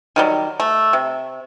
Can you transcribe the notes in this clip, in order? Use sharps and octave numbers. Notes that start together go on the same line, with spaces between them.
D#3 F#3 G3
A3
C3